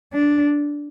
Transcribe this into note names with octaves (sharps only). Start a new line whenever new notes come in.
D4